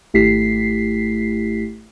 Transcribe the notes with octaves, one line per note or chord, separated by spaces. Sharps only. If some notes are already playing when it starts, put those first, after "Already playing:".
G#1 A3 E4 G4 B6 C7